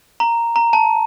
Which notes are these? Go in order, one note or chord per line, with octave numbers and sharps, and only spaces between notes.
A#5
A#5
A5